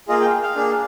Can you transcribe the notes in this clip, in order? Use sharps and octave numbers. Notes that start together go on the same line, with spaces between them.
A#3 F4 G#4 D#5
G5
F5
A#3 D4 G#4